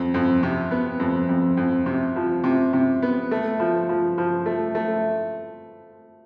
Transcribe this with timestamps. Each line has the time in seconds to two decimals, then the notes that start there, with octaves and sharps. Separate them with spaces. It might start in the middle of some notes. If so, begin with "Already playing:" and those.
Already playing: F2
0.14 F2
0.43 C3
0.71 B3
1.00 F2
1.29 F2
1.57 F2
1.86 C3
2.16 F3
2.44 C3
2.73 C3
3.02 B3
3.31 A3
3.60 F3
3.89 F3
4.18 F3
4.46 A3
4.75 A3